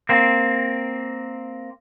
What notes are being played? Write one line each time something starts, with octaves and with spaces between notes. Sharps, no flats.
A#3 C4